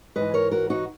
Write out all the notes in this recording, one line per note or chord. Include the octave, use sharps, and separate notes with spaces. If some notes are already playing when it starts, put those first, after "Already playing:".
G#2 E3 B4 D#5
A#4 C#5
F#4 A#4
D#4 F#4